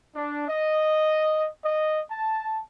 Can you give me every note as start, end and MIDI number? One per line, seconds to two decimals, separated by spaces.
0.15 0.44 62
0.48 1.48 75
1.63 2.00 75
2.11 2.59 81